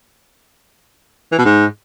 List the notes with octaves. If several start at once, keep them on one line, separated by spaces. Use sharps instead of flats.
E3
B2
G#2